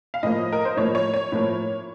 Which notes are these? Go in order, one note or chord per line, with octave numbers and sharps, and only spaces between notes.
F5
A2 F3 A#3 D#5
A#4
C5
A2 F3 A#3 C#5
C#5
C#5
A2 F3 A#3